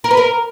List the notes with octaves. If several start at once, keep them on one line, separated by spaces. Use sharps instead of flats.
A#4
B4
A#4